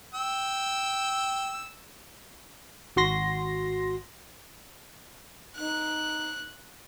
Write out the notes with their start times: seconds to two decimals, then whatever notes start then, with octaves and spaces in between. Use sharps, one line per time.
0.14 G5 E6
2.96 G#1 F#4 C6 A#6
5.57 D#4 F#6